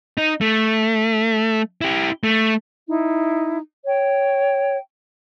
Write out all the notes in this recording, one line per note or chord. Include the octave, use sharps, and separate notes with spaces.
D#4
A3
E4 G4
A3
D#4 E4
C#5 G5